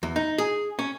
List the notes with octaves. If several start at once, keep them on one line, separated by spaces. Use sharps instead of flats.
E2
D#4
G#4
C#4